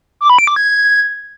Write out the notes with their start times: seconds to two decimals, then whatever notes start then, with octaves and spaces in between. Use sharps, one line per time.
0.21 D6
0.30 B5
0.39 D7
0.47 D6
0.56 G#6